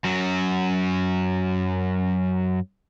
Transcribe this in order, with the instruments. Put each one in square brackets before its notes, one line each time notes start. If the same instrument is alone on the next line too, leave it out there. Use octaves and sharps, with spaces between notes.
[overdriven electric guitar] F#2 F#3